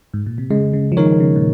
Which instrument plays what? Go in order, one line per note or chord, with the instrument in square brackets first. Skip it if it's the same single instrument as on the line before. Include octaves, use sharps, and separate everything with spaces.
[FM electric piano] G#2
A#2
C3
[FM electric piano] C#3 [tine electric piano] G#3
[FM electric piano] C#3
F3
[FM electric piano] D#3 [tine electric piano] D#4 A#4 C#5
[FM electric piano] C#3
A#2